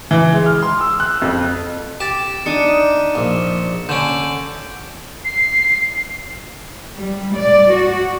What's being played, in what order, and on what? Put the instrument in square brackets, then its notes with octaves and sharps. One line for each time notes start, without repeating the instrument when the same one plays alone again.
[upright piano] E3
G#3
F6
C6
E6
F#6
F2
[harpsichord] G4 [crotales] A6 E7
[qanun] D4 D#4 [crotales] C#7 D#7 E7
[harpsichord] A#1 [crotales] E7
[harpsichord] D3 C#4 [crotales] G6 D7
[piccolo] C7
[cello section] G3
D5
F#4